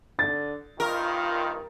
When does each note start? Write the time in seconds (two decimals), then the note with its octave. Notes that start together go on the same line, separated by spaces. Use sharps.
0.19 D3 A6
0.80 C2 G2 D#3 F4 A#4